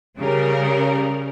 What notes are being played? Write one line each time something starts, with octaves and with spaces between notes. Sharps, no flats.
C#3 G3 A#4